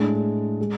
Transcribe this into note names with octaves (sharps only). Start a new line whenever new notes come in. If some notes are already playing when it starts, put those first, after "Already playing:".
Already playing: A2 G#3 D4
G#3